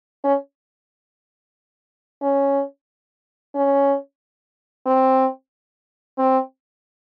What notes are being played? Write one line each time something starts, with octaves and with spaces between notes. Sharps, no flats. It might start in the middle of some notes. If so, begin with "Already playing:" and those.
C#4
C#4
C#4
C4
C4